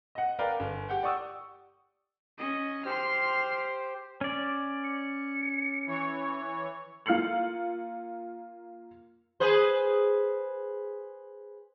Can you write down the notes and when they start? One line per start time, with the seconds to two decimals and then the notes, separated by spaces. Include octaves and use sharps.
0.15 D#5 F#5
0.39 A#4 B4 D5 F5 G5
0.60 G1
0.89 G4 F#5 G5
1.03 D5 F#5 C#6 D#6 E6
2.38 C#4 D#5
2.86 G4 C5 C6 F6
4.21 C#4 D5
4.84 C#7
5.87 E3 C#5
7.06 A#3 F4 F6 C7 C#7 F#7
9.40 G#4 B4 C5